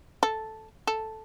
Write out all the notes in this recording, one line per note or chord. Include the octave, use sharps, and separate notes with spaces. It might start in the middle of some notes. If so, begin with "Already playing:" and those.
A4
A4